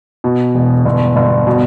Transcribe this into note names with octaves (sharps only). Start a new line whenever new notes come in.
B2
E1
G1
G1
B2